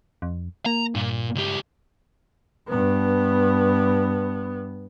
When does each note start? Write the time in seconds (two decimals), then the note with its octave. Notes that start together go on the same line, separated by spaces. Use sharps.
0.22 F2
0.66 A#3 A#5
0.95 G2 A#2
1.35 C#2 G4
2.68 G2 B3